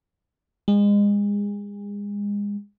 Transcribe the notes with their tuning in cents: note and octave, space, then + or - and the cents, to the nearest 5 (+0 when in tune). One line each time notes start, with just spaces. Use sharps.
G#3 -30